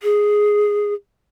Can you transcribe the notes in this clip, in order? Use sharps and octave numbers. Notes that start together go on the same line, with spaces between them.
G#4